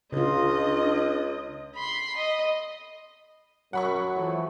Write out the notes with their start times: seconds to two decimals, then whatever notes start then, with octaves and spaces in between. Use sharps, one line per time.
0.12 C#2 C#3 D4 F4 D#5
1.75 B5 C6
2.17 D#5
3.73 F#2 F#3 F#5 B5 C#6
4.15 E3 F3 A3